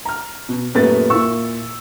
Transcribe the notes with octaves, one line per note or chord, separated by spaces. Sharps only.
A#5 F6
B2
F#2 A#2 A3 B3 G4 A6
A#2 A#3 E4 C#6 E6